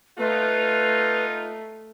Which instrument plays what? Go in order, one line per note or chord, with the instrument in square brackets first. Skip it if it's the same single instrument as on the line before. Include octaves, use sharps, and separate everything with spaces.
[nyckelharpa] A3 [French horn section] D#4 F4 [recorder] B4